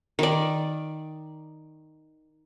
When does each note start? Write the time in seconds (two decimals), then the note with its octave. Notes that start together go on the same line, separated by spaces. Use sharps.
0.19 D#3 D5